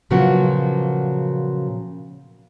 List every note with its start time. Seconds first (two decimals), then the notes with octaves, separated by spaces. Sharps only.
0.10 A#2 C#3 F3 F#3 B3 F#4